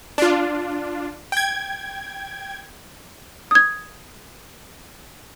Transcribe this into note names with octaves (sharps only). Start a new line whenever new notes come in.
D4 F4
G5 G#6
D#6 G#6